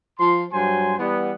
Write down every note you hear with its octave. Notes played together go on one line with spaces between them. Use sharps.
F3 C6
G2 F#3 C5 G#5 C6
E3 G3 B3